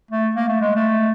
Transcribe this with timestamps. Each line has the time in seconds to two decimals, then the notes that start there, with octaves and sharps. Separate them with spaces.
0.11 A3
0.35 A#3
0.48 A3
0.61 G#3
0.76 A3